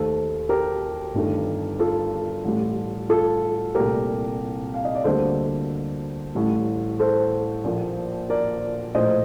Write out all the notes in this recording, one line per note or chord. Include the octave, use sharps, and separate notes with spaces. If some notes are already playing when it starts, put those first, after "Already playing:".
Already playing: D#2 D#3 A3 A4 C5
G4 A#4
G1 G2 D#3 A3
F4 A4
A1 A2 G3
F4 A4
C2 A#2 A3 G4 A#4
F5
D#5
D5
D2 D3 G3 A#3 A4 C5
A1 A2 G3
A4 C5
A#1 A#2 F3 A#3
A#4 D5
A#1 A2 A3 C5 D#5